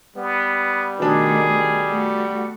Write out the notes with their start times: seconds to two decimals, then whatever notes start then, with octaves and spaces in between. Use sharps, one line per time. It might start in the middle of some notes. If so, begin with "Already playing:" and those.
0.17 G3 B3
1.00 B2 D#3 A3 D4 G#4
1.88 A3 F#4